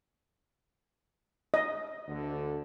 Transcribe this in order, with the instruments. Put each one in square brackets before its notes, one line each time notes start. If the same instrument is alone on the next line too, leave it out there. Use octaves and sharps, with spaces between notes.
[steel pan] D#5
[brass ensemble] D2 D3